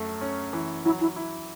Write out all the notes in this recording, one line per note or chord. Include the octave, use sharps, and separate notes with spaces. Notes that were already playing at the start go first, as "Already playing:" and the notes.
Already playing: F#2 A3
C#4
E3
F#3 E4
E4
E4